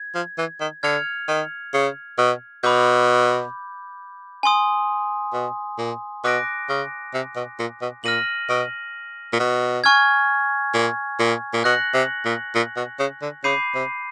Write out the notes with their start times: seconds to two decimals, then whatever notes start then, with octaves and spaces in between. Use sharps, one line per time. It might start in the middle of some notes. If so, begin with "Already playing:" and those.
Already playing: G#6
0.15 F3
0.38 E3
0.61 D#3
0.83 D3 F6 G#6 C#7 F7
1.28 D#3
1.74 C#3
2.18 B2
2.63 B2 B5 D6 G6
4.43 G#5 C6 D#6
5.33 B2
5.78 A#2
6.24 B2 D6 F#6 A#6 D7
6.69 C#3
7.14 C3
7.36 B2
7.59 A#2
7.81 B2
8.04 A#2 F6 A#6 D#7 F#7
8.49 B2
9.33 A#2
9.39 B2
9.84 G#5 C#6 F6 G#6
10.74 A#2
11.19 A#2
11.53 A#2
11.64 B2 F#6 A#6 C#7 F#7
11.94 C3
12.25 A#2
12.55 A#2
12.76 B2
12.99 C#3
13.22 D3
13.44 C#3 B5 D6 G6 C7 D#7
13.75 C3